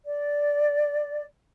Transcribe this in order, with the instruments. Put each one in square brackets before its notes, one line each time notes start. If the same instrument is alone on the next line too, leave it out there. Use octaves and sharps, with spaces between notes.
[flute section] D5